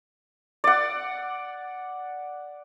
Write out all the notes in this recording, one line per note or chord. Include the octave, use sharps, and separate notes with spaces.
D5 F#5